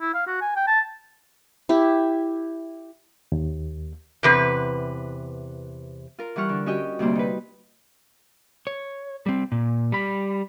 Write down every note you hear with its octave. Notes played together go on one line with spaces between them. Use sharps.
E4
F5
F#4
G#5
G5
A5
E4 G4
D#2
E2 C3 B4
F4 A#4
E3 G3 F#5 C#6 F6
D3
C#4 F#4 G4 D#5 G5
D2 C3 G3 A#3 C5 D5
D#4 B4
C#5
G3 C4
A#2
G3 B5